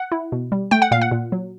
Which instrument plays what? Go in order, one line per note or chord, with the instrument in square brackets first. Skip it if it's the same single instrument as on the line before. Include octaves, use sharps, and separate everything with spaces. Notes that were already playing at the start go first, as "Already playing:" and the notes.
Already playing: [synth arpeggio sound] F#5
E4
B2
G3
A3 G5
F#5
A#2 F5
F#5
A#2
F#3